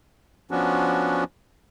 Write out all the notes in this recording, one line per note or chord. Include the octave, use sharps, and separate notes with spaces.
F3 B3 C#4 D4 F#4